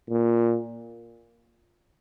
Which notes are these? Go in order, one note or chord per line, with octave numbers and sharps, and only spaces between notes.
A#2